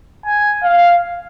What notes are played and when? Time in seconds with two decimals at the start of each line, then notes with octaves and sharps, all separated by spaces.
0.25 G#5
0.63 F5